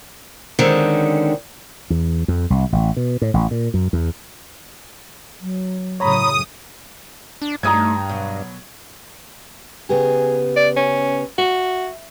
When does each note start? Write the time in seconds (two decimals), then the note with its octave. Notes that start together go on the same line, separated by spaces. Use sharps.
0.59 D3 D#3 G#3 C4 C#4
1.90 E2
2.28 F2
2.50 C2
2.72 A1
2.96 B2
3.22 A2
3.34 A1
3.51 A#2
3.74 F#2
3.93 E2
5.41 F#3
6.00 F#2 A2 C#3 C#5 A#5 B5 D#6
7.42 D4
7.63 G2 A3 D4 D#4 A#5 D#6 G#6
8.09 B2 F#3
9.89 C#3 B3 G4 G#4
10.57 D5
10.76 C#4
11.38 F#4 E5